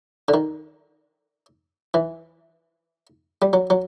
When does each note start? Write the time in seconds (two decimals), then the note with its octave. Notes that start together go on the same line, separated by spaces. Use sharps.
0.28 D3
0.34 D#3
1.94 E3
3.42 G3
3.53 F#3
3.70 F#3